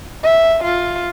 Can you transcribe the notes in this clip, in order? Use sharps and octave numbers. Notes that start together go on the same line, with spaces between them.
E5
F4